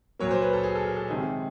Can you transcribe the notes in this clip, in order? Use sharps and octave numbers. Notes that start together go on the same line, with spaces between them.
A#2 F#3 A#3 C#5
C5
B4
A4
G#4
A4
A#4
A4
C3 D#3 G#3 G#4